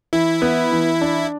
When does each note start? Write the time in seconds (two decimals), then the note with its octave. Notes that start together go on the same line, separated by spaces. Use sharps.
0.13 E3 E4
0.42 B3
0.72 E3
1.01 D4